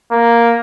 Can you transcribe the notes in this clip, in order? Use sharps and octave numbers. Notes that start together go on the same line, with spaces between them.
A#3